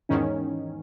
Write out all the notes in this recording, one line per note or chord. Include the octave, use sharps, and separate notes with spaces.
E2 G#2 D#3 C#4